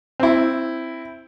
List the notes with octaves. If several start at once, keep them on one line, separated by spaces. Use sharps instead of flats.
C4 E4